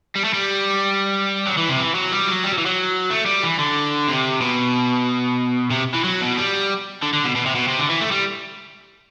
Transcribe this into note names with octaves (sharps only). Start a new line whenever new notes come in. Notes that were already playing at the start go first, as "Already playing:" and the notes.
G3
A3
G3
F#3
E3
C3
E3
F#3
G3
F#3
G3
F#3
E3
F#3
A3
G3
E3
D3
C3
B2
C3
E3
F#3
B2
G3
D3
D3
B2
B2
C3
B2
C3
D3
E3
A3
G3